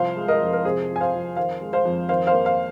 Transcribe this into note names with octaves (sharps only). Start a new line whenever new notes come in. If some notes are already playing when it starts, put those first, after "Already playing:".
Already playing: C2 F3 C5 F5
G#3
A#4 D#5
F2
A#4
C3 G#4 C5
F3
G#5
C5 F5
F2
D#3 C5 F5
G#3
C5 F5
F2
D#3 C5 F5
C5 F5
A#3
C5 F5